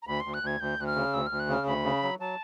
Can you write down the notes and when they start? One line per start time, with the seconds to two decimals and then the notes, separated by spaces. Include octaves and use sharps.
0.02 A#5
0.07 D2 B5
0.20 D2 C6
0.34 F#6
0.43 D2 G#6
0.60 D2 G6
0.79 D2 F#6
0.87 F6
0.95 C#3
1.13 D2 E6
1.27 D2 F6
1.40 F#6
1.49 C#3
1.54 F6
1.66 D2 B5
1.84 C#3
2.03 F#3
2.20 F#3 A5